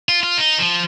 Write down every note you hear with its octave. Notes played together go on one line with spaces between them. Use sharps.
F4
F4
D#4
F3